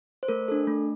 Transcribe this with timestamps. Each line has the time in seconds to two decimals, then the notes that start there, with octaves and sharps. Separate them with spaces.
0.23 C5
0.28 A3 A#4
0.48 D4 A4
0.67 A3